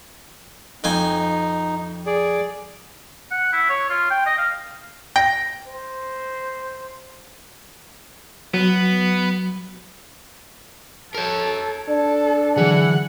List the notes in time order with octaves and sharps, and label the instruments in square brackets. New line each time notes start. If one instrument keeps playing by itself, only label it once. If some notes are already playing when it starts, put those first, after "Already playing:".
[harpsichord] F2 C4 G#5 [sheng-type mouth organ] D#4
[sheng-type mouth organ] G#4 D5
[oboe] F#5
E4
C#5
F4
G5
D#5
F5
[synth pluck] G5 [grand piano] A#6
[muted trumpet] C5
[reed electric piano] F#3 [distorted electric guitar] B3
[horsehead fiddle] A4 [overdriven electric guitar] A#4 C#5
[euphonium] D4 [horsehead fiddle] A4
[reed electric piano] D3 F#3 G#4 [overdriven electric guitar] E3 [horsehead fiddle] F#5